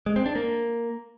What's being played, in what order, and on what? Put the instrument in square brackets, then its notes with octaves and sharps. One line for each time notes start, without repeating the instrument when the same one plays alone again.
[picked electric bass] G#3
C4
D4
A#3